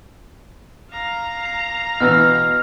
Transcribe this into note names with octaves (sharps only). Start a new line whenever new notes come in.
F5 A#5
C7
B2 E3 F6